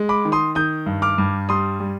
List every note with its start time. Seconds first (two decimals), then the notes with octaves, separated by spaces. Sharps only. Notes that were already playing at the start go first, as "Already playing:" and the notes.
Already playing: G#3
0.09 B5 D6
0.25 D#3
0.32 C6 D#6
0.55 D#3 D#6 G6
0.86 G2
1.02 D6 F6
1.18 G2
1.49 G3 C6 D#6
1.80 G3